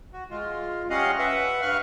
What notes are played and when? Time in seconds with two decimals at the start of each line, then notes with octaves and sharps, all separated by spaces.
0.13 F#4
0.31 G#3 F4
0.90 G3 C#4 D#5 F5 F#5
1.19 B4 E5 F#5
1.62 G2 B4 F5 C#6 F6 F#6